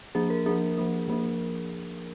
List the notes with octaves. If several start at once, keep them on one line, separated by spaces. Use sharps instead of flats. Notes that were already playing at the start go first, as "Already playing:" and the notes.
F3 A#3 D4 G#4
A#4
F3 A#3 D4 G#4
F3 A#3 D4
F3 A#3 D4